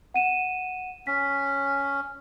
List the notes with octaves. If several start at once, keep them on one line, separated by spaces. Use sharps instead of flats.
F#5 D#7 E7
C#4 B6